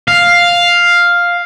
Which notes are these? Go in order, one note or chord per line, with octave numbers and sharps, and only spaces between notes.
F5